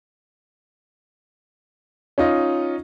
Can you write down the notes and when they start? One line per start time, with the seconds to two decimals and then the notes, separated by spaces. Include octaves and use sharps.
2.18 C#4 D#4 F4 D#5